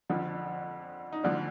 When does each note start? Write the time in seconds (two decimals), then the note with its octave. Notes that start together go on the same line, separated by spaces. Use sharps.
0.10 F2 D3 F3
1.13 D#4
1.23 D2 D3 F3 D4